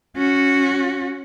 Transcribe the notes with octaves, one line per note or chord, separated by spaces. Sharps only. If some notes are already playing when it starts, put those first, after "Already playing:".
C#4 F#4